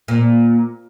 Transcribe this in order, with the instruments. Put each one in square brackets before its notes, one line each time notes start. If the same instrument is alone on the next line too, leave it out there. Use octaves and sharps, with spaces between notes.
[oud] A#2